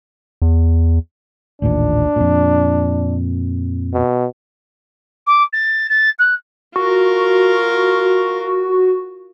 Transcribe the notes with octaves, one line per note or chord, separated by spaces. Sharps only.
E2
A1 D#2 A#2 D4
F2 A#2
B2
D6
A6
A6
F#6
F4 F#4 A#4